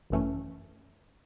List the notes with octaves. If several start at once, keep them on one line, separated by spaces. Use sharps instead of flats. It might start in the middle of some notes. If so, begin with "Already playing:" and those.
G#1 F#2 E3 A3 C#4